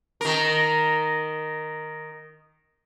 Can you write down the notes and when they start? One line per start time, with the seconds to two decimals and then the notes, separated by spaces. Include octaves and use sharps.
0.21 D#3 A#4